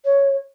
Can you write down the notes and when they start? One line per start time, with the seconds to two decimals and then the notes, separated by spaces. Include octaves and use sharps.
0.05 C#5